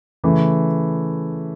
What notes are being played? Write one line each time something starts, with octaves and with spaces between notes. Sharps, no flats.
C#3 E3 A3